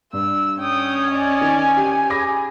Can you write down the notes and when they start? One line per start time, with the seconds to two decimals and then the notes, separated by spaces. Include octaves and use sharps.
0.13 G2 E6
0.61 C#4 G5 D#6
1.11 D5 D#5 G#5
1.41 D#3
1.77 G4
2.10 G#4 B5 D6 A#6